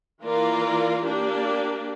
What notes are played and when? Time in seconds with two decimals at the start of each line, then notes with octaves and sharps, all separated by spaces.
0.23 E3 A#3 F4 A#4 D5
1.05 A#3 D4 G4 D5